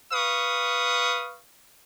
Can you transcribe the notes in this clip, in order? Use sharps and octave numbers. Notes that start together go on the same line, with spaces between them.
B4 F5 C#6 D#6